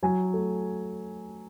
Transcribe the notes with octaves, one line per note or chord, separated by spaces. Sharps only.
F#3 G#5
A3